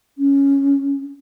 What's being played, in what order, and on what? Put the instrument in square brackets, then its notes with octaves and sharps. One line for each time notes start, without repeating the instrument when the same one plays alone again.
[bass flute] C#4